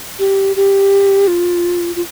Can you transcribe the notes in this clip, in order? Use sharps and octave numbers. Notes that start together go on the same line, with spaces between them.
G4
G4
F4
F4